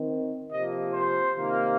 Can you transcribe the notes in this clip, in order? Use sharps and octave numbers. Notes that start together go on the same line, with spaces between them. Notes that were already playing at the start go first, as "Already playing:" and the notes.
Already playing: D#3 C4
C3 F3 A#3 D#5
C5
C3 D#3 A#3